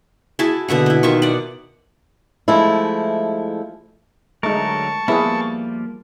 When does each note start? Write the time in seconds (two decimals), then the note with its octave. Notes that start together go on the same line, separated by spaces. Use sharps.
0.39 E4 F#4 G#4 A5
0.68 B2 D3 E5 F#5
0.86 B3 E4
1.03 D#3 F4 E5 C#6
1.22 D5 F#5
2.48 F3 G#3 A3 E4
4.43 D3 F#3 G#3 A3 D#4 A#4 A5 C#6
5.08 F3 G3 A#3 B3 E4 G#4 B4